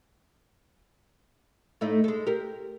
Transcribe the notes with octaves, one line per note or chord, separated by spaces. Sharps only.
A2 A3 D#4
G#3 A4
G4 A#4